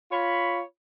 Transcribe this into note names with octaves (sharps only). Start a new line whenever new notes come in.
F4 C#5 B5